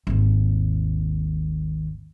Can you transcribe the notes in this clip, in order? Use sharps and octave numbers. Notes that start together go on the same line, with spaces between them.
G#1 D#2